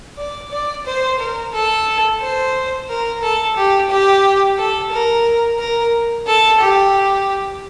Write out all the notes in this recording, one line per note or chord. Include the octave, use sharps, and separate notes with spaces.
D5
D5
C5
A#4
A4
C5
A#4
A4
G4
G4
A4
A#4
A#4
A4
G4